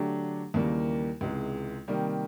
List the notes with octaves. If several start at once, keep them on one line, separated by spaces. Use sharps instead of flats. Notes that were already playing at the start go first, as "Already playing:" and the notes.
Already playing: D3 F#3 A3 D4 G4
D#2 C#3 E3 G3 A#3
C#2 C3 E3 G#3
C3 D#3 G3 A#3